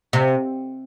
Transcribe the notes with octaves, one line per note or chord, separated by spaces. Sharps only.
C3